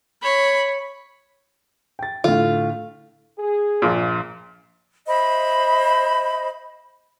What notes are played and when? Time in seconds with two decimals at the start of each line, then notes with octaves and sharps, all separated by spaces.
0.22 C#5 B5
1.99 G5 A6
2.24 A2 D3 F4
3.38 G#4
3.82 A#1 A#2
5.07 C5 D#5 E5 B5